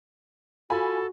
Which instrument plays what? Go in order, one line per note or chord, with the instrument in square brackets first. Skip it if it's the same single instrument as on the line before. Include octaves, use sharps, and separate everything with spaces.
[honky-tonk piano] F4 G#5 B5 [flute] F#4 [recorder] A4